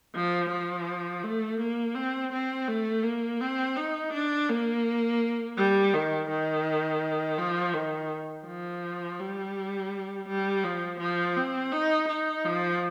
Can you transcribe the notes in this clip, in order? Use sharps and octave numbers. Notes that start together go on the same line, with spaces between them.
F3
F3
A3
A#3
C4
C4
A3
A#3
C4
D#4
D4
A#3
G3
D#3
D#3
F3
D#3
F3
G3
G3
F3
F3
C4
D#4
D#4
F3